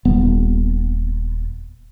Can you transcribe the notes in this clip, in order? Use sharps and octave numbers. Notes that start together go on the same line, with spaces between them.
D#1 B3